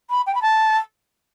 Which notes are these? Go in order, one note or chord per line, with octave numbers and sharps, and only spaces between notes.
B5
G5
B5
A5